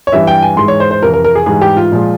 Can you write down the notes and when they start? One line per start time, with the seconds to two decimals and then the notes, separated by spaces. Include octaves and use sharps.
0.07 C#5
0.12 G2 E3 G3 E5
0.27 G5
0.42 G#5
0.57 G#2 E3 G#3 C6
0.68 C#5
0.80 C5
0.91 C5
1.02 F2 C3 E3 A#4
1.14 A#4
1.24 A#4
1.35 G#4
1.46 G#2 E3 G3 G#4
1.61 G4
1.77 F4
1.92 A#2 F3 G#3